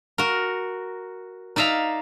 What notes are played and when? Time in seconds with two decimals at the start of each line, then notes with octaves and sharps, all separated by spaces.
0.18 F#4 A#4
1.56 D#4 D5 E5 F5 A#5